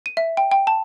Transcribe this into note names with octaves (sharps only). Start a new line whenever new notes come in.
D#7
E5
G5
G5
A5